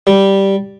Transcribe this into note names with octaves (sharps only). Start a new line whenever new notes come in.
G3